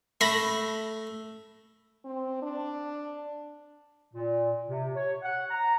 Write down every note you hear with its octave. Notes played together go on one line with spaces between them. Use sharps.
A3 B5 A#6
C4
D4
A#2
C3
C#5
F#5
A#5